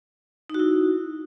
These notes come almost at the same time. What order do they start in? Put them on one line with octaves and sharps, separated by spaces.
D#4 F#4 E4